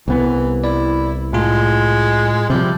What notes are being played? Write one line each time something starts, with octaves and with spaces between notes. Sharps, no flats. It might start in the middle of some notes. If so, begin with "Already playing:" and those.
C2 E3 B3
E4 D5
A2 G#3 F4
C3 F3 G3